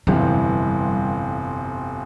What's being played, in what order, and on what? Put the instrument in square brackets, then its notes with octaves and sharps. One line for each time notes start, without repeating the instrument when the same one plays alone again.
[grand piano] G1 F2 C3 E3 [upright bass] G3